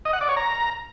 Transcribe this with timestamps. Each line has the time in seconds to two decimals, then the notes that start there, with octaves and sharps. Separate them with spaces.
0.05 D#5
0.13 F#5
0.21 D5
0.29 C#5
0.37 A#5